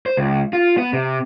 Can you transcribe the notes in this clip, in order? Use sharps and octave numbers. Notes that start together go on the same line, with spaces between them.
C5
C#2
F4
B3
C3